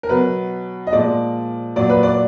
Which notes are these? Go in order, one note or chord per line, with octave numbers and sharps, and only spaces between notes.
A#4
B2 F#3 B4
D#5
A#2 F3 G#3 D5
A#2 F#3 D5
B4
D5